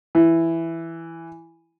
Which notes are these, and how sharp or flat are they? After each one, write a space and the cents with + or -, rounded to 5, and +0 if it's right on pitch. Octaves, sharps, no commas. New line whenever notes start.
E3 +5